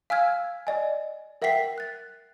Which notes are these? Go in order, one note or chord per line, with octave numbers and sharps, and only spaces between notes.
F5 G#5 E6 F6 G#6
D5 D#5 G#5
A#4 E5 F#5 G5 B6 C7
F#6 A6